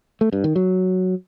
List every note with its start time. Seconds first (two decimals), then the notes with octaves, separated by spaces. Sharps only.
0.21 A3
0.33 G2
0.44 D#3
0.56 F#3